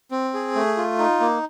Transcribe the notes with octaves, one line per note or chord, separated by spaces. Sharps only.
C4
G#4
A3
F4
D#4
A#3